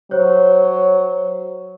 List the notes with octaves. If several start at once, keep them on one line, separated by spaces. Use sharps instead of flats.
F#3 C5 C#5